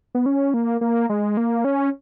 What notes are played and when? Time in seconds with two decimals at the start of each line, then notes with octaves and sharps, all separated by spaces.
0.15 B3
0.26 C#4
0.54 A#3
0.81 A#3
1.10 G#3
1.37 A#3
1.65 C#4